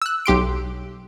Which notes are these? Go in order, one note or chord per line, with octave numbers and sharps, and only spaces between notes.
E6 F#6
B1 G4 C6 D7